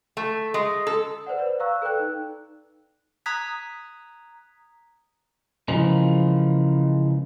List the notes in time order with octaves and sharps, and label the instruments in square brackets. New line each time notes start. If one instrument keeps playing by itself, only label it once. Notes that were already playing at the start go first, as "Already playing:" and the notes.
[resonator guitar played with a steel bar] A3
G#3
A4
[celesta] B4 C5 D5 F#5
B4 D5
F5 A#5 C#6 E6 F#6
A4 B4 D5 G5 F#6
D#4
[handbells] A#5 D#6 F#6 G#6 B6
[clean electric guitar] C#3 E3 F3 G#3 A#3